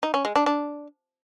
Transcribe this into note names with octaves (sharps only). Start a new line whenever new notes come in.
D#4
C#4
G#3
D4
D4